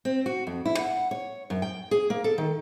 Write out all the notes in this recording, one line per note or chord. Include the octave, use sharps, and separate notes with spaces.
C4
F#4
F2
E4
F#5
C#5
F#2
G5
G#4
A#3
A4
D#3